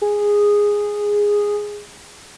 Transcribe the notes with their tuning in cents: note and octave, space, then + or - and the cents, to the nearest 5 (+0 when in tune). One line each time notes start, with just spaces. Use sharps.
G#4 -10